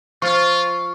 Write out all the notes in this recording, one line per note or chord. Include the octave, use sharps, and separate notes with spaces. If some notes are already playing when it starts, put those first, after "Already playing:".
F3 F4 C#6